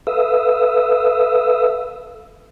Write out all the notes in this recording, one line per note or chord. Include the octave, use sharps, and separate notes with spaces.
A4 B4 E5 F5 D#6 E6